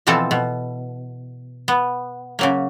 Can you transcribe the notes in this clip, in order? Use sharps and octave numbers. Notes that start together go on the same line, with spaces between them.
B2 E3 F3 C4 A4
B2
B3
C#3 F#3 A#3